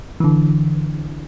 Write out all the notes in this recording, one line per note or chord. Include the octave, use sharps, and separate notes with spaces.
D3 E3